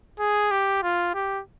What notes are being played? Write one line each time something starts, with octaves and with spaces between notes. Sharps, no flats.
G#4
G4
F4
G4